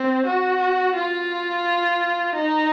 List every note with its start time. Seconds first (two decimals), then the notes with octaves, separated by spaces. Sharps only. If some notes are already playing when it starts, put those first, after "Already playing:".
Already playing: C4
0.26 F#4
0.96 F4
2.35 D#4